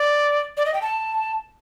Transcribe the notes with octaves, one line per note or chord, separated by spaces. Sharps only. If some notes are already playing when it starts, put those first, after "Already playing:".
Already playing: D5
D5
D#5
G5
A5